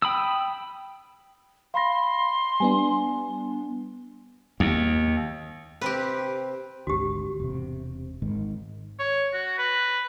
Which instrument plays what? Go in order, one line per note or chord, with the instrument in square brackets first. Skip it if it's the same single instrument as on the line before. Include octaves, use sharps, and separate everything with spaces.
[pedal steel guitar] G5 B5 D#6 E6
[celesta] F5 B5 A#6 [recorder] C6
[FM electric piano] G3 B3 D4 [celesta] G#5
[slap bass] D#2
[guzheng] C3 C4 [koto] G4 B4
[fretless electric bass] G#1 D2 [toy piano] F#4 G4
[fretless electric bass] E1 C3
G#1 G#2 D#3
[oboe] C#5
F#4
B4